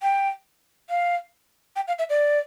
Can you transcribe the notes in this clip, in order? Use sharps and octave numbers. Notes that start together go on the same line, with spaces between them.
G5
F5
G5
F5
E5
D5